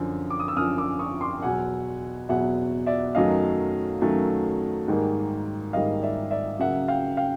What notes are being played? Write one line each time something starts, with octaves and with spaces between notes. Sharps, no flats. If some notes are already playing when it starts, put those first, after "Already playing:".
Already playing: F#2 D3 F3
D6
D#6
E6
F#2 D3 F3 D#6 F6
D6 E6
C#6 D#6
C6 D6
E2 B2 F#3 F#5 G#5
E2 B2 F#3 E5 F#5
D5 E5
F#2 D#3 F#3 A3 D#5 F5
F#2 D#3 F#3 A3
G#2 D#3 G3 A#3
G#2 D#3 G3 A#3 D#5 F5
D5 E5
D5 E5
C#3 F#3 A#3 E5 F#5
F5 G5
F5 G5